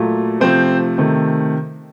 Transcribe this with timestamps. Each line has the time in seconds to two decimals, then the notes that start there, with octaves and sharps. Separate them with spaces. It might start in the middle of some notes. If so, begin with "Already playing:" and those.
Already playing: A#2 F#3 A3
0.40 C3 F3 A3 C4 C5
0.98 C3 D#3 A3